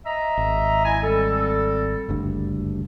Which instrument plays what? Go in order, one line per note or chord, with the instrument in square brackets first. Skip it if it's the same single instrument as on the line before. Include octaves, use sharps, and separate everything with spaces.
[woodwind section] D#5 E5 A#5
[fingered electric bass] G#1
[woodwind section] E4 D#5 G#5
G3 C4 A4
[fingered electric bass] F#1 D2 G2